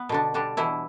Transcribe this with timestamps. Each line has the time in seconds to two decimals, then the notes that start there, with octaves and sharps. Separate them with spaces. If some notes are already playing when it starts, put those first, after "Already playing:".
Already playing: B3
0.09 B2 D3 D4
0.34 D3 G3 D4
0.57 B2 E3 E4